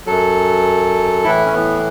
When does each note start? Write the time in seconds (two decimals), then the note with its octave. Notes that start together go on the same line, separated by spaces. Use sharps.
0.06 F#2 F#3 A4
1.24 A2 E3 E4
1.46 C#4
1.54 B3